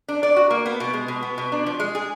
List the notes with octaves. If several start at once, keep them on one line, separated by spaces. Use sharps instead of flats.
D4
D5
F#4
A#3
B3
B2
G#3
B2
B3
B2
D4
F3
G#3
G#4